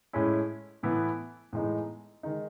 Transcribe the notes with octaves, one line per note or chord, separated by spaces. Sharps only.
A2 G#3 C#4 E4
A2 E3 B3 E4
A2 E3 G#3 B3 D#4
D#3 G#3 D#4